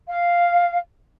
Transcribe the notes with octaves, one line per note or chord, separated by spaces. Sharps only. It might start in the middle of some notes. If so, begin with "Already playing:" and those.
F5